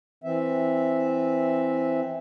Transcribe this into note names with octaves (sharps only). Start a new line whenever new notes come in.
E3 C4 E5